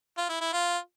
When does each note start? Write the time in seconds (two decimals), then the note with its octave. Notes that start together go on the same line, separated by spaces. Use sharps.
0.17 F4
0.29 E4
0.41 E4
0.53 F4